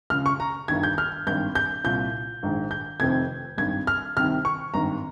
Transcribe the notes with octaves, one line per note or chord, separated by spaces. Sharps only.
C#2 C#3 F6
C#6
A#5
G1 G2 D#3 G#6
G6
F6
G#1 G2 D#3 G6
G6
C2 A#2 G6
A#1 G#2 D#3
G6
F1 F2 C3 D#3 G#6
G#1 G2 D#3 G#6
F6
C2 C3 D#3 F6
C#6
G#1 G2 D#3 A#5